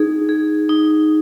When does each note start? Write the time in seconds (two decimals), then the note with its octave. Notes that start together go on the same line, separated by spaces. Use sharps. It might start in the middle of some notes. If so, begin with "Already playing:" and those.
Already playing: D#4 G#4
0.29 G#4
0.69 D#4